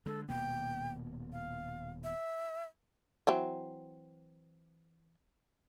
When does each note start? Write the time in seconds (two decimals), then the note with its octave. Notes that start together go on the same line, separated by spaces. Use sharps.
0.06 D3 G#3 A4
0.29 D#1 B2 A#3 G5
1.32 F5
2.04 E5
3.27 E3 F#3 C4